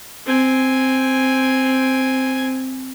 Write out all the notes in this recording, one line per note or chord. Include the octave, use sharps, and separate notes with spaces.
C4 G#5